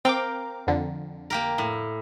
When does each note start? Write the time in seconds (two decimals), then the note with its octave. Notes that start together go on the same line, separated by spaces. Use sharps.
0.05 C4 A#4 F5 G5 D6
0.67 F2 D3
1.30 A#3 G4 A#4
1.58 A2